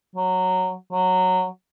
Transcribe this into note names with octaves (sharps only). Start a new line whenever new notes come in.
F#3
F#3